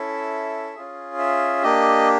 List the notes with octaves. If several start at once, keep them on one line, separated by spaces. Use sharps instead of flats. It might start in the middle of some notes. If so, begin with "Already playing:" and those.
Already playing: C#4 E4 A4 E5
C#4 F4 G#4
E5
A#3 D4 G4 D#5